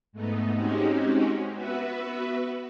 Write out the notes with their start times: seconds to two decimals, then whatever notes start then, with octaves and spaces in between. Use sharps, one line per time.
0.13 G#2 A3 B3 D#4
0.55 G#3 C4 C#4 D#4 F#4 G4
1.53 B3 F#4 B4 E5